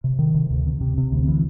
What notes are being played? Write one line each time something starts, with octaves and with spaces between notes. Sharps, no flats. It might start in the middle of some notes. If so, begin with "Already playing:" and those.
C3
D#3
C3
D2
C3
C3
C3
D2
E3